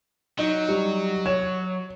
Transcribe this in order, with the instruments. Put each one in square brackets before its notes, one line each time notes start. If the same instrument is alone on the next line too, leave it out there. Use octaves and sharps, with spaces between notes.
[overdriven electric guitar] F#3 [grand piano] D#4
[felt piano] G3
[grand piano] C#5 [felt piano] E7